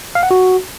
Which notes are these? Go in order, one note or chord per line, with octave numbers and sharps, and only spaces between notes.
F5
F#5
F#4